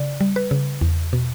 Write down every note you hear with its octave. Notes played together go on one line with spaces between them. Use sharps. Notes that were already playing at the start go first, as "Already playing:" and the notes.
Already playing: C#3 D5
G3
B4
C#3
E2
B2